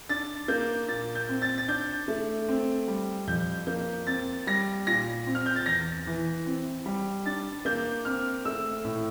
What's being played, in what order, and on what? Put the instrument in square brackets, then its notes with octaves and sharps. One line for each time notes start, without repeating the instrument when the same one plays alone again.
[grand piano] D4 A6
A#3 G6
A#2 A6
G6
C4
A6
A6
D4 G6
A3
C4
G3
F2 G6
A#3 G6
C4 A6
G3 A#6
A#2 A#6
C4
F6
G6
A6
E2 A#6
E3
C4
G3
D4 A6
A#3 G6
C4 F6
A3 E6
A2